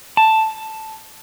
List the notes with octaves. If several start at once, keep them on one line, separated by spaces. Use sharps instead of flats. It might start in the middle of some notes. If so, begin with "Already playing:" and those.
A5